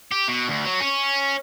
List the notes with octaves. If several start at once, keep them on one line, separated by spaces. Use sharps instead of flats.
G4
B2
D2
F#3
C#4